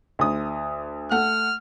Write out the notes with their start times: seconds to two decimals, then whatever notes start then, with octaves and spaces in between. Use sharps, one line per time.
0.19 D2 D#6
1.11 A3 F#5 F6